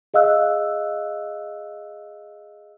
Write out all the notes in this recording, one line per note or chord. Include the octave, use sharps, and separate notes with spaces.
G#4 D#5 F5 E6 F#6